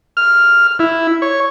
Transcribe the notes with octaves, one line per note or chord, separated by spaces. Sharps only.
F6
E4
C#5